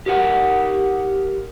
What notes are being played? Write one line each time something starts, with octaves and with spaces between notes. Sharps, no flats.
G4 A#4 F#5